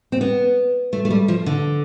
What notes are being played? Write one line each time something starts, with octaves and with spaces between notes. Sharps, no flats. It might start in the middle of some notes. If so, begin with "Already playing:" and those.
C4
B3
A3
A3
G3
F3
D3